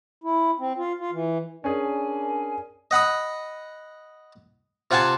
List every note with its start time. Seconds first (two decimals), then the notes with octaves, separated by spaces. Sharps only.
0.24 E4
0.60 C4
0.77 F4
0.99 F4
1.12 E3
1.64 C#4 D4 G#4 A#4 G#5
2.91 D#5 F#5 B5 D#6
4.91 C3 F4 F#5 G#5 A5